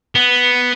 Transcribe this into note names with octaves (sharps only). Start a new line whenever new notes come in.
B3